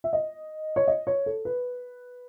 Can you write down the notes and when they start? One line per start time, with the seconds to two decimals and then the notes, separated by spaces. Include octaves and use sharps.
0.04 E5
0.13 D#5
0.76 C#5
0.88 D#5
1.07 C#5
1.26 A4
1.45 B4